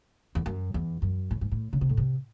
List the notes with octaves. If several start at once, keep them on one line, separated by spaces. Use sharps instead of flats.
E2
F#2
E2
F#2
A2
G#2
A2
C#3
C3
A2
C3